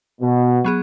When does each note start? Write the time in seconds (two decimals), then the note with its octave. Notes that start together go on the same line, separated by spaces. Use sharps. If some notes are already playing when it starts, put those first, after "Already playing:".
0.21 B2
0.64 F#3 B3 G#4